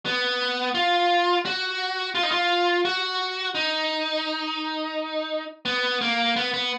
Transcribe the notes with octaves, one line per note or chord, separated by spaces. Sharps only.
B3
F4
F#4
F4
D#4
F4
F#4
D#4
B3
A#3
B3
B3